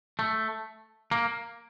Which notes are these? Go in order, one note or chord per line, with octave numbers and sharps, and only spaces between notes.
A3
A#3